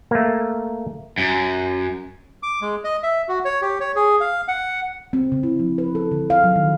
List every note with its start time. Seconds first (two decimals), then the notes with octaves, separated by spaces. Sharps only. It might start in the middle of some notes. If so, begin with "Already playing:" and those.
0.11 A3 A#3
1.18 F#2
2.43 D6
2.61 G#3
2.84 D#5
3.03 E5
3.28 F#4
3.45 C#5
3.62 G4
3.80 C#5
3.96 G#4
4.21 F5
4.48 F#5
5.13 C4
5.32 C#3
5.43 E4
5.59 F3
5.78 B4
5.95 A4
6.12 D3
6.30 F5
6.44 F#3
6.56 D#3